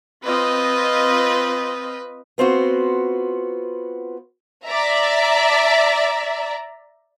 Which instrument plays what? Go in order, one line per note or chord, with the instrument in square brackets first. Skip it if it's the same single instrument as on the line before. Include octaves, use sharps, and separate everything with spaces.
[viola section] C4 F4 D#5 [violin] B4
[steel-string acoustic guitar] B3 C4 F4 F#4
[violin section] D5 E5 A#5